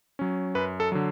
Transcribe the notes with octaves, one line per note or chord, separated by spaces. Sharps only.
F#3 C#4
F#2 B4
A4
D3 F#3